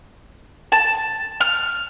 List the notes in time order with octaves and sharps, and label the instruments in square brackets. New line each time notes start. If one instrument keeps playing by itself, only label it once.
[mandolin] A5
F6